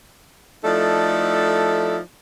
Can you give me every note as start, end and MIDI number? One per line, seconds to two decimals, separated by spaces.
0.65 1.98 53
0.65 1.98 57
0.65 1.98 63
0.65 1.98 64
0.65 1.98 69
0.65 1.98 74